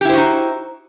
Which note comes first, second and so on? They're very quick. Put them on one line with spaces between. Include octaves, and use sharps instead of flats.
G4 E4 C5 F#4 D#4